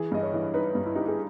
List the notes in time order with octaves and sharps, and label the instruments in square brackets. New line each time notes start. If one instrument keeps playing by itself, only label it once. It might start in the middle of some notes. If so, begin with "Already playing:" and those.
Already playing: [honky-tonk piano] E3 [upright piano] G#4
[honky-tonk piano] G2 [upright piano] D#5
[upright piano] C#5
[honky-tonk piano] E3
[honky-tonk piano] D#4 [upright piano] B4
[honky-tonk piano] G2
[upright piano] E4
[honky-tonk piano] D#4 [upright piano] G4
[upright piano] G#4